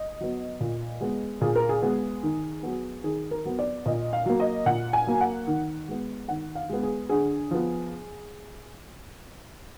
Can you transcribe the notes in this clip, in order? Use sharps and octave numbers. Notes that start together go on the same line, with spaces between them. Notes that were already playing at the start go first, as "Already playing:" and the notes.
Already playing: D#5
F#3 B3
A#2
G#3 B3
A#2 G#4
A#4
G#4
G#3 B3
D#3
F#3 B3
D#3 G#4
A#4
F#3 B3
D5
A#2 D#5
F5
F#3 A#3
D#5
A#2 F#5
G#5
F#3 A#3
F#5
D#3
G#3 B3
D#3 F#5
F5
G#3 B3
G#4
D3 G#4
F3 B3